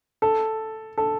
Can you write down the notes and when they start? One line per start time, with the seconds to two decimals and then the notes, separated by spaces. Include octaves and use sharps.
0.22 A4
0.98 A4